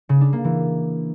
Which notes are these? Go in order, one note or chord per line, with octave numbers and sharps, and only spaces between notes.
C#3
D4
A#3
E3